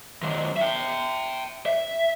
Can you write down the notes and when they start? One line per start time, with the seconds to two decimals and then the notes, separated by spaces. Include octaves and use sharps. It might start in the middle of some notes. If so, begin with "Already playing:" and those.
0.22 D#3 F#3
0.57 E5 G5
1.66 E5